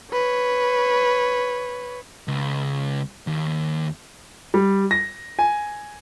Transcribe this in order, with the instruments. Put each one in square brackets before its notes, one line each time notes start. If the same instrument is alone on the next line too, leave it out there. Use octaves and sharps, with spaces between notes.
[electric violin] B4 C#5
[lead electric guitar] C#2
D#2
[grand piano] G3
A#6
G#5